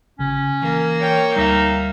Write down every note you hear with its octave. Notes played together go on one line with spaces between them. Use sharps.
G#1 C#3 C#4
E3 A#3
C#5 G5
D2 G3 D#4 E5 F5